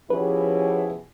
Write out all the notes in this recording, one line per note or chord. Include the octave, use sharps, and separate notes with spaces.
B2 F3 C#4 E4 G4 G#4 B4